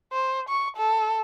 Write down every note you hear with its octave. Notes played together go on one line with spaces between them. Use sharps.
C5
C#6
A4